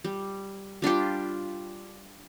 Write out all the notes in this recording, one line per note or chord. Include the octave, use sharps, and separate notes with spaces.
G3
G3 D4 F4 G4